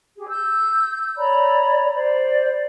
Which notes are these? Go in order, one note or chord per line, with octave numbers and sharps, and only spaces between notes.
G4 G#4
E6 G6
C#5 D5 A#5 B5
C5 D5